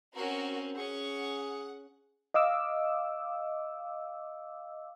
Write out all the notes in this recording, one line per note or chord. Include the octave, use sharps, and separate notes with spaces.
C4 C#4 F#4 A#4
C#4 G#4 F#5 C#6
D#5 F5 D6 E6